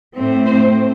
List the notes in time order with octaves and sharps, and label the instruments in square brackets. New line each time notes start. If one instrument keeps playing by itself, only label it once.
[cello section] A2 A3 C4
C5